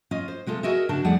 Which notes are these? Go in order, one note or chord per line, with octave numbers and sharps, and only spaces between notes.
C#4 F4 D#5
C5
C3 G#3 F4 A4
F#4 G#4 A#4 D#5 E5
C#3 D4 F#4 A5
F2 G3 A3 G#4 D5 F#5